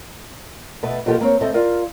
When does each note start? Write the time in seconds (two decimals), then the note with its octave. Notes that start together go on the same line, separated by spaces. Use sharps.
0.83 B2 A3 B4
1.06 B2 F3 A#3 F4 G4 A4
1.21 A#3 C4 C#5
1.41 A3 C4 E4 A4 C5 D#5
1.54 F4 A#4 D5 F5